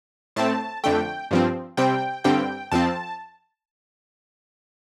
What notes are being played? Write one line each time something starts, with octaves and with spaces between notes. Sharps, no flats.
A2 A3 C4 A5
F2 D3 A3 G5
G2 F3 C4
C3 G3 C4 G5
G2 D3 G3 C4 G5
F2 F3 C4 A5